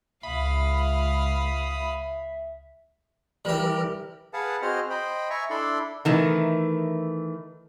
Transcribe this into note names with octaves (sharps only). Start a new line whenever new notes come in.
C#2 E5 F5 B5 D#6
E3 G3 G4 A#4
G#4 B4 F5 F#5 A5
C4 F#4 G#4 C5 D#5 F6
C5 D#5 G5 B5
E5 G#5 A#5 C#6
D4 E4 A4 D5 B5 C6
D#3 E3 A3